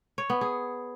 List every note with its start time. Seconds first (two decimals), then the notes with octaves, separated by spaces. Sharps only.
0.18 C#5
0.30 B3
0.41 G#4